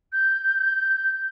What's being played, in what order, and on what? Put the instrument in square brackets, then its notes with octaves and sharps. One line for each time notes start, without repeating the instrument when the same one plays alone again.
[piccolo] G6